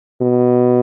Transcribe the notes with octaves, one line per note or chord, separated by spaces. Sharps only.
B2